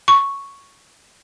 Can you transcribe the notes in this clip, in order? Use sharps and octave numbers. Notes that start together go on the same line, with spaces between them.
C#6